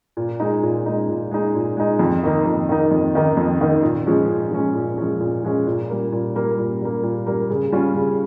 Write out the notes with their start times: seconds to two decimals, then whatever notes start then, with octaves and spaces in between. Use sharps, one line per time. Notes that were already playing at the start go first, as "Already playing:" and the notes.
0.17 A#2
0.40 G#3 D#4
0.63 A#2
0.86 G#3 D#4
1.09 A#2
1.31 G#3 D#4
1.55 A#2
1.77 G#3 D#4
1.99 F2
2.23 D#3 A#3 D#4
2.46 F2
2.69 D#3 A#3 D#4
2.91 F2
3.15 D#3 A#3 D#4
3.37 F2
3.61 D#3 A#3 D#4
3.83 A#2
4.07 F3 G#3 C#4
4.29 A#2
4.51 F3 G#3 C#4
4.75 A#2
4.98 F3 G#3 C#4
5.20 A#2
5.44 F3 G#3 C#4
5.67 A#2
5.89 G3 A#3
6.12 A#2
6.35 G3 A#3
6.58 A#2
6.81 G3 A#3
7.03 A#2
7.26 G3 A#3
7.50 C#3
7.72 G3 C#4 F4
7.95 C#3